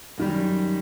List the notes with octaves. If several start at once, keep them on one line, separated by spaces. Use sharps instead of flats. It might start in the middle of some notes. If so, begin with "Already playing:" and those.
F#2 D#3 G3